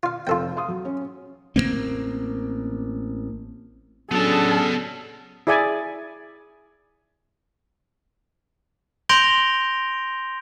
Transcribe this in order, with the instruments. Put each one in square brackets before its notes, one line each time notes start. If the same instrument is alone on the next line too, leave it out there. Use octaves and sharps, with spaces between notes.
[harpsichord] F4 F5
[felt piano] F1 [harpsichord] F4 A4 G5
[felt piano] F5 C6 D#6
F#3
C#4
[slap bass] A1 F#3 A#3 C4
[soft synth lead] F#3 [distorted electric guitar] B3 A5 [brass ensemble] C#4 D4 G#4 [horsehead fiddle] A4
[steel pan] E4 G#4 D5 E5 G#5
[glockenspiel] C6 G6 A#6 D7 F7 G7